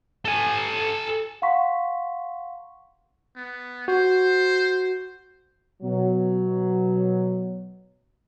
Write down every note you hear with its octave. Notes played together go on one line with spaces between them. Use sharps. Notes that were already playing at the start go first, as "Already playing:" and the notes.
A4 G#5
F5 F#5 A#5 C6 C#6 B6
B3
F#4 C5
B2 F#3